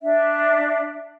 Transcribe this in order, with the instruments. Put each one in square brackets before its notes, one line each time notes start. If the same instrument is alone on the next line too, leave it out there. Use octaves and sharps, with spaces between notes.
[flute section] D4 E5